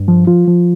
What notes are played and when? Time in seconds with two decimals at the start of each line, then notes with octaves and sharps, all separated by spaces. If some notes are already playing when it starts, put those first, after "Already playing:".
Already playing: G2
0.08 F3
0.27 F3 F4
0.48 F3